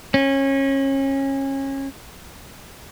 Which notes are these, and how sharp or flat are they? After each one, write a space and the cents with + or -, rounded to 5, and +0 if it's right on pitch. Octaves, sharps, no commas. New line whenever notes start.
C#4 -25